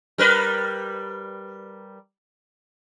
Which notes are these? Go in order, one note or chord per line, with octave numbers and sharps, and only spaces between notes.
G3 A#4 B4